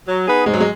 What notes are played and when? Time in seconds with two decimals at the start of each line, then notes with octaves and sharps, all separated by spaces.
0.08 F#3
0.27 B3 D#4 G#4 B4
0.46 G#2 G#3
0.53 F#3
0.60 G#3